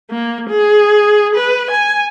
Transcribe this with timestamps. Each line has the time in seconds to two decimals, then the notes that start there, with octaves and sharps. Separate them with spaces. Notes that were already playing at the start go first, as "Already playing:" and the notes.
0.11 A#3
0.50 G#4
1.36 B4
1.71 G#5